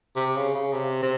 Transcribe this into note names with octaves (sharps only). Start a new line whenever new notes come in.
C3
C#3
C#3
C3
C3